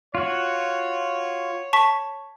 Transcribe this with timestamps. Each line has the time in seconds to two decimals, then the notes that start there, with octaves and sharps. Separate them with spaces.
0.15 F4 F#4 C#5
1.73 A5 C#6 B6